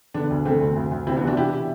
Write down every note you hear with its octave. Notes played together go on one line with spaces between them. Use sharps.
D3 B3 D4
D2
D3 A3 C4
D2
D2
D2
C3 C4 E4
B3 D4
E3
D4 F#4
B2 E4 G4